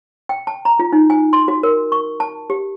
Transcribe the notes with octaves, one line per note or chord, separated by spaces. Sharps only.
G5
A5
A#5
F4
D#4
G#5
C6
F#4
A#4
C#6
A5
G4